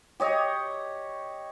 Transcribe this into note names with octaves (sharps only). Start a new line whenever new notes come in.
G4 C#5 D#5